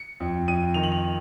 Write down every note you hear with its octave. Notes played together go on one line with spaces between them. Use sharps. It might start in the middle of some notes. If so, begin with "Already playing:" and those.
Already playing: C#7
F2
F2 D#7
D#3 F7
F#7
F7